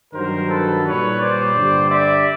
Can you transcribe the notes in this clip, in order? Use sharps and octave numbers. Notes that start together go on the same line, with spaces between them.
G2 D#3 F#3 A#4 C5
A4 B4
A#2 G3 B4 C#5
C5 D5
G2 D3 G3
D5 E5